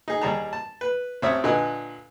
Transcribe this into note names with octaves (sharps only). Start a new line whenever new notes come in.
D#4 G#4
D#2 G3 G#4 A5 A#5
A5
B4
A1 C4 C#5 E5 D#6
A#2 D3 B4 D#5 G#5